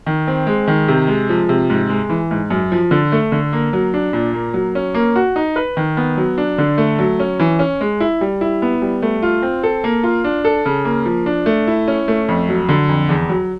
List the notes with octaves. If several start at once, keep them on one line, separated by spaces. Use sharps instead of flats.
D#3
C4
G#3
D#3
C3
G#3
F3
C3
G#2
G#3
E3
G#2
F#2
F3
D3
A3
D3
A#3
F#3
D4
A#2
A#3
F#3
C#4
A#3
F#4
D#4
B4
D#3
B3
F#3
D4
D3
A3
F#3
C#4
E3
C#4
G#3
E4
G3
E4
B3
G3
A3
F4
C4
A4
A#3
F4
D4
A4
C#3
A#3
F3
D4
A3
E4
C#4
A3
F2
F#3
D3
F2
E2
F#3